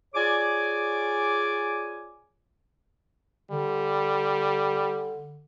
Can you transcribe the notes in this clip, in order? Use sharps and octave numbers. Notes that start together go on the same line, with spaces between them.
F4 G#4 C#5 D5 G#5 D6
D3 G3